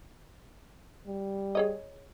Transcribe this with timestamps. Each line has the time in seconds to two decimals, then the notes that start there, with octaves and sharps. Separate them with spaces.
1.07 G3
1.55 G#4 C#5 D#5